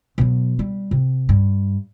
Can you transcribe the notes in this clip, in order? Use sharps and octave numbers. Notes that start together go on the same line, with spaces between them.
B2 F#3
G3
C3
G2